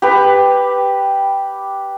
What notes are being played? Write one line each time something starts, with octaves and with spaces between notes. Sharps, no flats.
G4 B4